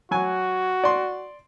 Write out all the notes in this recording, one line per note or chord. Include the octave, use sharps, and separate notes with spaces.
F#3 F#4 G#5
D5 C6